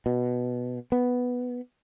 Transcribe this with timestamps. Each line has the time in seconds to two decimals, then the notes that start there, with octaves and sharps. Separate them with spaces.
0.06 B2
0.92 B3